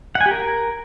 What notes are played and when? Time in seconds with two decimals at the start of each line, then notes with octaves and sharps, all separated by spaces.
0.15 F#5
0.21 G#5
0.26 G4
0.31 A#4